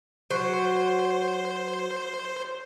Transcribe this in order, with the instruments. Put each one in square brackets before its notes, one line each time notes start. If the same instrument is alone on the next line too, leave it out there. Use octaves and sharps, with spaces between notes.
[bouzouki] F#3 [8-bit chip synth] C5